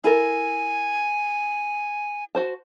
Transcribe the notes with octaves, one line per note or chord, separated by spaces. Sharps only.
E4 A4 A#4 G#5
F#4 C5 A5